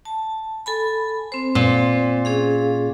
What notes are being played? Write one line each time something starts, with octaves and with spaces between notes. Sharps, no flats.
A5
A4 G#5 B5
C4 C5
A#2
C#4 G#4 F5